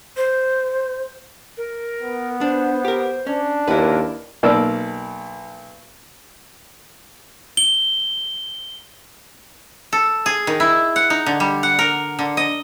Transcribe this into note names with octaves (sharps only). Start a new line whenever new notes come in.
C5
A#4
B3
D4 C5
G4 A#4
C#4 D4
D#2 E4 A#4 B4
B1 B2 A#3 D5 E6
G7
A4
G#4
D#3
E4
F#5
D#4
D3
G3
F#5
A#4
D3
D#5